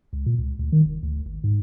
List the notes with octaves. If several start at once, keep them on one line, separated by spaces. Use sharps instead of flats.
C#2
A#2
C#2
D2
D#3
F1
D2
G#1
G#2